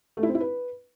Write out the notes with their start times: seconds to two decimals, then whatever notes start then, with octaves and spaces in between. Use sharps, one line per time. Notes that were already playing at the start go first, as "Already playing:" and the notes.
0.17 A3
0.23 E4
0.29 C4
0.35 E4
0.41 B4